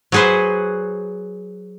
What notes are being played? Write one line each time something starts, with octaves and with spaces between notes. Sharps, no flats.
F#3 F#4 G#4 B4 C5